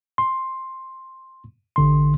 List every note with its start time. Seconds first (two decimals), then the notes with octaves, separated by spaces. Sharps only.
0.18 C6
1.76 A1 D3 C6